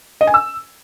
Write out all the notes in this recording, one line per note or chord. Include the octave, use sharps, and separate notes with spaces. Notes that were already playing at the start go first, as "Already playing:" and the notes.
D#5
G#5
E6